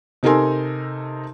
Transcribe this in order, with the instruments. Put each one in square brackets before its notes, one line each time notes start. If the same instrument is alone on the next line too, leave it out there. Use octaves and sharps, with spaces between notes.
[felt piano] C3 D#4 A4 A#4 G#5 C6